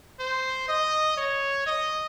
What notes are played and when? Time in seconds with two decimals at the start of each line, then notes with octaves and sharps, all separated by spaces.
0.20 C5
0.68 D#5
1.17 C#5
1.66 D#5